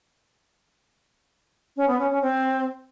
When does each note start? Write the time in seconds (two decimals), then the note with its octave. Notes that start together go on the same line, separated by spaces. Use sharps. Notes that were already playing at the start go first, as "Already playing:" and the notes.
1.77 C#4
1.88 B3
1.99 C#4
2.10 C#4
2.22 C4